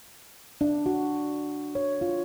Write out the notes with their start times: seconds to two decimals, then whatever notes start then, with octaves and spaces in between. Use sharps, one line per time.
0.61 D4
0.86 F#4
1.75 C#5
2.01 F4